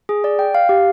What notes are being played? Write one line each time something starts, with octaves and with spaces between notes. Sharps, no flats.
G#4
D5
G5
F5
G4